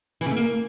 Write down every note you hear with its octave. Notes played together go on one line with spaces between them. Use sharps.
E3
C#3
A3
A#3